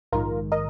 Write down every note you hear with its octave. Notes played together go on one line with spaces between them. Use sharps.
A#1 G#2 D#3 F4 A#4
A#4 D#5